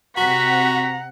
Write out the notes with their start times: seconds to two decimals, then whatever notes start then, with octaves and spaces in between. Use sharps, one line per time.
0.17 C3 F#4 F#5 A#5 B6